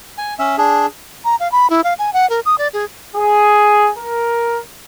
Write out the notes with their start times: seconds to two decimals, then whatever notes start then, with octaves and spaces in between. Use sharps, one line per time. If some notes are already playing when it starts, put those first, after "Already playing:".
0.18 G#5
0.39 C#4 E5
0.58 D4 G#4
1.25 A#5
1.40 F5
1.52 B5
1.70 E4
1.84 F5
1.99 G#5
2.13 F#5
2.30 A#4
2.46 D#6
2.58 D5
2.73 G#4
3.15 G#4
3.98 A#4